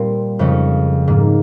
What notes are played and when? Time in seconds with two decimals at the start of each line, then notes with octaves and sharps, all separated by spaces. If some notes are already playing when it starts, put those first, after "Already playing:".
Already playing: A#2 G3 C4
0.39 F2 C#3 G#3 C#4
1.07 G#2 D#3 A#3